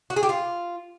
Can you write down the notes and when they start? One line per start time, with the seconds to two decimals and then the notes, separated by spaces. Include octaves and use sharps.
0.10 F#4
0.16 G#4
0.23 G4
0.29 F4